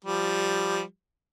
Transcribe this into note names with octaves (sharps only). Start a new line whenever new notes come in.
F3 G3